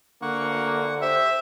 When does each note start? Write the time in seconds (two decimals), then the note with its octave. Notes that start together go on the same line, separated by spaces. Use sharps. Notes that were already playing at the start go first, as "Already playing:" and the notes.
0.22 D3 A#3 F#5 C#6
1.02 G4 C5 E5